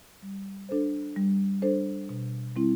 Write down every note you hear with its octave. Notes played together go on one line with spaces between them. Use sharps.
G3
D4 A4 C5
G3
D4 A4 C5
B2
G3 C4 E4